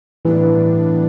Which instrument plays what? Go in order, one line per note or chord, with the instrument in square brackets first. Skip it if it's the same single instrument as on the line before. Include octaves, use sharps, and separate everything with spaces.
[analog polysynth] A2 G3 B3 D4 [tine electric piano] E3